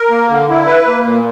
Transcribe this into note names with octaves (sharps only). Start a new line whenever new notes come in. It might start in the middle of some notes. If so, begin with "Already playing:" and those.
Already playing: A#4
A#3
D3
E4
B4
A#3
A#2